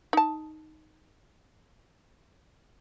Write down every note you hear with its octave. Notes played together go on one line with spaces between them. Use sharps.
D#4 A5